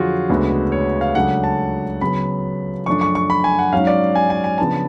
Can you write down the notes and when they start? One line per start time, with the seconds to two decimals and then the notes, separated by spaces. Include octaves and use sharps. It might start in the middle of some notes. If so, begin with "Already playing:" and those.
Already playing: F2 D3 F#3 F4 F#4 G#4
0.29 D2 C#3 G#3 B3 D4
0.72 C#5
1.01 F5
1.15 C#2 C#3 F#3 A3 D4 F#5
1.44 A5
2.01 C#3 F#3 B3 B5
2.86 F#2 F3 A3 D4 C#6
3.01 C#6
3.15 C#6
3.30 B5
3.44 G#5
3.59 F#5
3.73 G#2 F#3 C#4 F5
3.87 D5
4.15 G#5
4.30 G#5
4.44 G#5
4.58 C#3 F3 B3 D4 A5